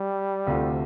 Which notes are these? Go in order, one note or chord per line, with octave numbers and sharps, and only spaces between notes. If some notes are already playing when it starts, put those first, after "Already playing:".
Already playing: G3
D2 C3 A3 F4